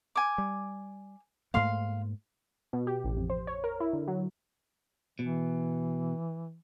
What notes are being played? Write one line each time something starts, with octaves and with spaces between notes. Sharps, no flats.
G#5 D6
G3
G#2 A3 A#3 F5 C6
B2
G4
A1
F2
C5
C#5
A#4
E4
D3
F#3
B2 E3